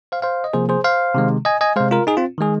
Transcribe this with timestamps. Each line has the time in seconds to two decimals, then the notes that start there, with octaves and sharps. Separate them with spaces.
0.12 C5 F5
0.22 C5 F5
0.44 D#5
0.53 C3 F3 A#3 G#4 C5
0.69 G#4 C5
0.84 C5 F5
1.15 C3 D#3 G#3
1.45 D#5 G#5
1.61 D#5 G#5
1.76 C3 G#3 C5 F5
1.91 F4 A#4
2.07 D#4 G#4
2.17 C4 F4
2.38 D#3 G#3 G#4